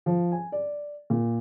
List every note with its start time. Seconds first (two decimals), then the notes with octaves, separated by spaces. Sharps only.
0.06 F3
0.32 G#5
0.52 D5
1.10 A#2